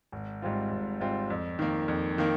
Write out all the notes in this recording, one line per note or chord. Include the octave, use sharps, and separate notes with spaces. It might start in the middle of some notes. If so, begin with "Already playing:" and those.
G#1
G#2 G3 C4 F4
G#1
G#2 G3 C4 F4
F2
D#3 A#3
F2
D#3 A#3